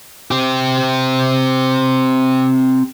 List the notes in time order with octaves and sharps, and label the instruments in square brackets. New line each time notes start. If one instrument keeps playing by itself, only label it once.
[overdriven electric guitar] C4 G4